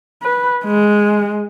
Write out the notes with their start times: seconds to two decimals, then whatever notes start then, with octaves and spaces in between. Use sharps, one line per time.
0.23 B4
0.65 G#3